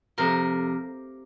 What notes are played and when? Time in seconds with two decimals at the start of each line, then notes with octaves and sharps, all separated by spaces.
0.18 F2 C3 F3 A3 A#4